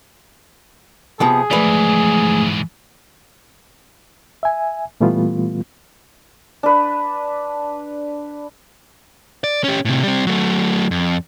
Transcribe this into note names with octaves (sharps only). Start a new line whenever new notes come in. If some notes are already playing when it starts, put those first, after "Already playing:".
C3 F3 B3 G#4
G#2 E3 F3 A3 B4 D5
E5 G#5
A#2 E3 G3 A3 B3 F4
D4 B4
D5
C#4 G4
A2 C3
G3 C4
F#3 A3
F2